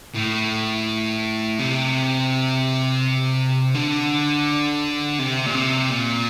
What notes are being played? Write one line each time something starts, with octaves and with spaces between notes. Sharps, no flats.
A2
C3
D3
C3
A#2
C3
A#2